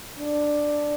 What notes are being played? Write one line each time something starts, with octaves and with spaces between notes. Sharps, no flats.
D4